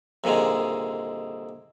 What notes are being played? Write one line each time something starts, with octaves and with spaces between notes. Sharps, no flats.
C2 A#2 D3 D#3 G#3